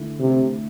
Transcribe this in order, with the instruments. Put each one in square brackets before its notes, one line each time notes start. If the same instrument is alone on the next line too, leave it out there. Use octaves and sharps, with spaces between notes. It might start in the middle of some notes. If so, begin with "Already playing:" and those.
Already playing: [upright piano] D3 A3 E4
[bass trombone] C3